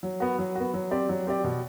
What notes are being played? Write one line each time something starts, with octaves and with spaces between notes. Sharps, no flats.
F#3
B3 F#4
F#3
B3 F#4
F#3
C4 G4 D5
F#3
C4 G4 D5
B2